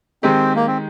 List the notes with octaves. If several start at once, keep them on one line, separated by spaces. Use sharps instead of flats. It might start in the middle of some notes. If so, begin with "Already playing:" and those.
D#3 G#3 C4 D#4 G4
A#3
C4